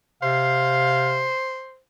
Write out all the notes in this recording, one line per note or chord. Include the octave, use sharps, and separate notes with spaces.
C3 C5 F5